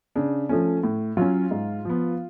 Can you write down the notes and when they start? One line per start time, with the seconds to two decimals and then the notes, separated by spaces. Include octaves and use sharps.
0.16 C#3 D4
0.49 F3 A3 C#4
0.83 A2
1.17 F#3 C#4 F4
1.51 G#2
1.85 F3 B3